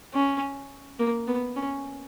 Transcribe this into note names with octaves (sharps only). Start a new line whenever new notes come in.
C#4
A#3
B3
C#4